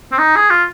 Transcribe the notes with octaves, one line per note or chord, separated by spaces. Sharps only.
C4
D#4
G#4
F4